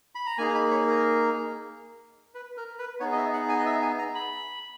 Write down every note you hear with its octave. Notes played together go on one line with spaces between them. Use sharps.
B5
A#5
A#3 D#4 G#4 G#5
B5
C#5
A#4
B4
A#4
B4
B3 D#4 G#4 C#5
D#5
E5
F#5
G#5
D#5
E5
G#5
A#5
B5